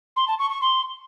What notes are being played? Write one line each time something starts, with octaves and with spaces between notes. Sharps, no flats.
C6
A5
C#6
C#6
C6